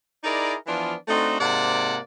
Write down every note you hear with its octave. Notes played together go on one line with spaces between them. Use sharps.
D#4 E4 G#4 A#4 D5
E3 F3 B3 D4 F4
A3 C4 D4 D#4 F#4 A4
G#2 C3 A#3 D5 F#5 A5